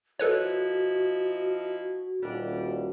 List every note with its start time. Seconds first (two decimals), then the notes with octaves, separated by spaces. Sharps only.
0.19 F3 D#4 E4 F#4 A4 B4 C#5
2.22 D#1 G3 D4